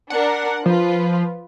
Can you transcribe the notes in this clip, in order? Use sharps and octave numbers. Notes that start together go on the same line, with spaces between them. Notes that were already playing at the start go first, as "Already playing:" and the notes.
D4 A#4 F#5
F3 F4 B4